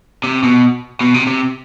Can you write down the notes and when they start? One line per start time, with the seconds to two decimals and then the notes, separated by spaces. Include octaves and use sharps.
0.24 C3
0.43 B2
1.01 B2
1.14 C3
1.27 C3